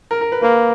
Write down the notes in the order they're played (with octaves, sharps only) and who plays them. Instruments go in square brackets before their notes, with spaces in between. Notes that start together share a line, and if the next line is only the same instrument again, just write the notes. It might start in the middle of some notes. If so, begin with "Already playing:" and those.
[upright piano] A#4
A#4
B4
[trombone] A#3 [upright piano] B4